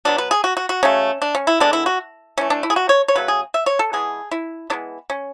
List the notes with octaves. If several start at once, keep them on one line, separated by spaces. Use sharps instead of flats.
B2 F#3 B3 D4
B4
G#4
F#4
F#4
F#4
C#3 F#3 A3 C#4
D4
C#4
E4
D3 G#3 B3 D4
E4
F#4
E3 A3 C#4
D4
E4
G#4
F#4
C#5
C#5
C#3 F#3 A3 B4
G#4
E5
C#5
A4
E3 G#3 B3 G#4
E4
E3 G#3 B3 D4
C#4